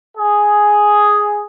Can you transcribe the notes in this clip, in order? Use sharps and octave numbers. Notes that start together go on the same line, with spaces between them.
G#4